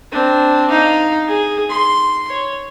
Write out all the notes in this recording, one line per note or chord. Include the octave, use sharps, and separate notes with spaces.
C4 D4
D#4 F5
G#4
C6
C#5